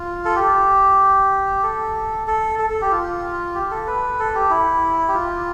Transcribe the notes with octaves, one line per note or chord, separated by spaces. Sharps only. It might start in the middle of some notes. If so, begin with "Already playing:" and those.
Already playing: F4
A4
G4
A4
A4
A4
A4
G4
F4
G4
A4
B4
A4
G4
E4
G4
F4